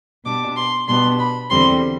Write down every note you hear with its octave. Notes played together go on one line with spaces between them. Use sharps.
B2 G3 D4 D6
C6
B2 G3 B3 D4 C6
B5
E2 D3 G3 C4 C6